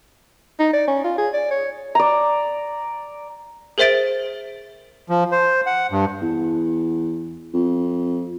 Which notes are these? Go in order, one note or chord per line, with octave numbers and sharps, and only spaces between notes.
D#4
D5
C#4
F4
G#4
D5
C#5
D5 A#5
G#4 A#4 C5 E5 A6 D7
F3
C5
F#5
G2
E2
F2